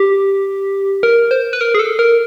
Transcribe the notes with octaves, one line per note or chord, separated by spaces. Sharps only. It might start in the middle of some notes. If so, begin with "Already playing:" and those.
Already playing: G4
A#4
C5
B4
A#4
G#4
A4
A#4